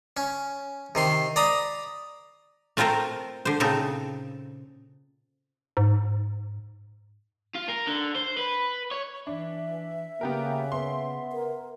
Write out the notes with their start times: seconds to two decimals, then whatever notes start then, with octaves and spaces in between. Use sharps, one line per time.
0.17 C#4
0.95 C3 D#3 C6
1.36 D5 A#5 B5 D#6
2.77 A3 C4 F4 A4 A#4 C5
3.45 D3 C5
3.60 A#2 C#3 C4 D#4 A4
5.77 G#2
7.55 F4
7.69 A#4
7.87 D3
8.15 C5
8.37 B4
8.91 C#5
9.27 E3 D4 E5
10.21 C#3 A#3 B3 G4 A#4
10.72 B3 C6
11.33 A#4